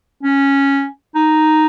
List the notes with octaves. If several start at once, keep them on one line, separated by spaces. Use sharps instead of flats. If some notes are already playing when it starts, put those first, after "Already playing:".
C#4
D#4